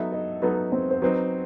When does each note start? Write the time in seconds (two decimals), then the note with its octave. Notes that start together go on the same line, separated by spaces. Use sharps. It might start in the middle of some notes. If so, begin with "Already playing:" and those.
Already playing: F#3 B3 D#4 A4 E5
0.12 D#5
0.42 F#3 B3 D#4 A4 B4
0.72 C4
0.91 C5
1.02 F#3 C4 D#4 B4